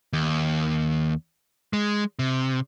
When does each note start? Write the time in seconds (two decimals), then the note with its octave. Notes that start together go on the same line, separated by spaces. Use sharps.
0.13 D#2
1.73 G#3
2.19 C3